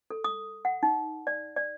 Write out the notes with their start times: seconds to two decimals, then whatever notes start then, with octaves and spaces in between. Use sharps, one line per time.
0.10 A4
0.24 D#6
0.65 F#5
0.83 D#4
1.27 D5
1.56 D5